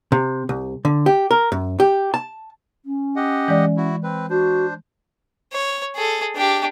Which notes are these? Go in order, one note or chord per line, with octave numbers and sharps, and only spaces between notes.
C3
C2
D3
G4
A#4
F#2
G4
A5
C#4
G4 D#5 F#5
E3 G#3 D5
E4 F#4
C4 B4
D4 F#4 C5
C#5
G#4 A4
D4 G4